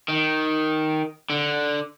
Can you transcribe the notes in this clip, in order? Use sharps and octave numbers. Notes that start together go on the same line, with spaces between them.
D#3
D3